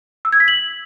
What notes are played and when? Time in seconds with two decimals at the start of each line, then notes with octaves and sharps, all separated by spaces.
0.25 E6
0.33 G#6
0.40 B6
0.48 F#7